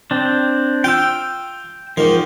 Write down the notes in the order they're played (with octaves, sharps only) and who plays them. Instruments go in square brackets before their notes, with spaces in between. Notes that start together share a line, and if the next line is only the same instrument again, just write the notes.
[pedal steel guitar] C4 D4
[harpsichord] F4 [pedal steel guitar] G5 E6
[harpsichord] G#2 D#3 [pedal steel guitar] F3